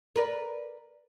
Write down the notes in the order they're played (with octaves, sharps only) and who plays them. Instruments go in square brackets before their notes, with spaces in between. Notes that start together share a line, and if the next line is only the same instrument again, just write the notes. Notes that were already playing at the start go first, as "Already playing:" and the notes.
[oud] A#4 B4 D5